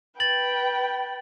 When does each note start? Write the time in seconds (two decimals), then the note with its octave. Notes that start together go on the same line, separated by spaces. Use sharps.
0.20 B4 G5 A6 F#7